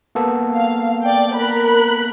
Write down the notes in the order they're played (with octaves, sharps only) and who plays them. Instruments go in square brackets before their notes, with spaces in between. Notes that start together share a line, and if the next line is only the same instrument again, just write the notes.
[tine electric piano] A#3 B3 A4
[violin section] F5
D5 G5
A#4 B5 F#6